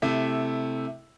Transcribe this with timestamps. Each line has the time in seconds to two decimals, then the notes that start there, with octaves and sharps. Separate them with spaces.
0.02 C3 A3 E4